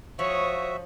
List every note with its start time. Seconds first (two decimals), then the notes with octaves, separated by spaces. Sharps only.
0.19 F3 F#4 C#5 E5 D#6